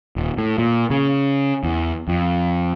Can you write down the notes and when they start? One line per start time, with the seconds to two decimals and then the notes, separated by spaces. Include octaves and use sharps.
0.16 D#1
0.38 A2
0.58 A#2
0.90 C#3
1.64 E2
2.08 F2